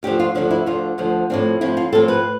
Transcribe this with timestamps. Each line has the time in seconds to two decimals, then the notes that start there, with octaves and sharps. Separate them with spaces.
0.03 D2 D3 F3 G4
0.20 F4
0.35 D2 D3 F3 D4
0.51 E4
0.66 D2 D3 F3 F4
0.98 D2 D3 F3
1.30 A2 F3 C4 D4
1.61 A2 F3 C4 E4
1.77 F4
1.93 A2 F3 C4 A4
2.08 B4